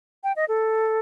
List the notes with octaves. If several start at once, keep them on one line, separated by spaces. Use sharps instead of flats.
G5
D#5
A4